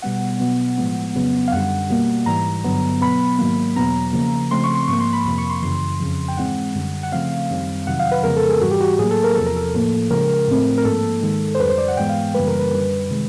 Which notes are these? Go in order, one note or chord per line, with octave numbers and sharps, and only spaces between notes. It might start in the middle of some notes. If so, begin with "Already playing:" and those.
B2 G3 B3 F#5
B2 F#3 B3
A2 F3 G#3 B3
F2 C#3 F#3 B3
F5
F#2 D3 G3 F#5
B2 G3 A#3
G#2 E3 G3 A#5
G2 D3 F#3 B3
B2 F#3 B3 B5
G#2 D#3 F#3 A#3
E2 B2 F#3 B3 A#5
C#3 F3 A#3
C#3 F3 A3 C4 C6
C#6
C6
G#2 F3 A#3 C#6
C6
B5
F2 C3 F3 A#3 B5
C#6
C6
F#2 C#3 E3 C6
F2 C#3 F3
G5
G#2 E3 G#3 C4 F#5
F#2 D3 G3
F#5
C#3 F3 A3 C4 F5
F#2 D#3 G3 C4
F2 C3 D#3 F#3 F#5
F5
B4
F2 C#3 F3 G#3 B3 A#4
A4
G#4
G#2 E3 G3 F#4
G4
F#4
G4
A2 F#3 A#3 G#4
A4
A#4
E2 C3 F3 A4
A#4
A4
A2 F3 A#3
C#3 F3 G#3 A#4
A2 F3 A3 C4
A#4
G#2 F3 A#3 A4
G#2 D#3 G#3
C5
F2 D3 G3 B4
C5
D5
F#5
G#2 E3 G#3 B3 G5
F5
F#2 C#3 E3 G3 A#3 B4
A#4
B4
F#2 D3 G3
C3 D#3 G#3